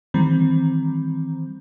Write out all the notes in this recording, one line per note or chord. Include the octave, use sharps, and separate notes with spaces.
D#3 E3 G3 C4